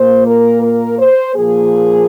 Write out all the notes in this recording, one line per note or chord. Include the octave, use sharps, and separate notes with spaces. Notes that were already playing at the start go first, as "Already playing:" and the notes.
Already playing: A#2 A#3 C5
A#4
A#4
C5
A#2 F3 A#3 G#4